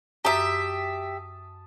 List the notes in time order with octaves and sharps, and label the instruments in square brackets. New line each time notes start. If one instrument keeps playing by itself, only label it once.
[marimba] F#2 [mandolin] G4 E5 [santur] A5 D#6